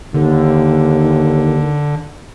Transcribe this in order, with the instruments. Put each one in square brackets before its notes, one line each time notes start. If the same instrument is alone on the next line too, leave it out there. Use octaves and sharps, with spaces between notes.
[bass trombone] D#2 [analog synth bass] D3